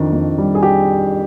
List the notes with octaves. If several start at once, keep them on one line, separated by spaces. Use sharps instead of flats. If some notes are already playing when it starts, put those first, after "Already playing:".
Already playing: F2 D#3 D4
F2
G3
G#4
G4